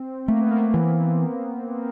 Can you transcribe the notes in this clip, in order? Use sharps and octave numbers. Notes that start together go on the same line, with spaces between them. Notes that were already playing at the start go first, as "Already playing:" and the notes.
Already playing: C4
A3 A#3
B3
A#3
E3